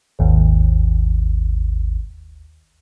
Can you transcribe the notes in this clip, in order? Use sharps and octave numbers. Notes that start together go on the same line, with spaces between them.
G#1 D#2